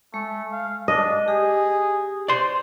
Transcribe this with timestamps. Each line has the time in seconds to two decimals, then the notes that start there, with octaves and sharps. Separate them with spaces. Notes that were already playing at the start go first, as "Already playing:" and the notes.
0.14 G#3 A3
0.52 F5
0.88 D4 D#5
1.28 G4 G#4
2.28 C5 D5 C6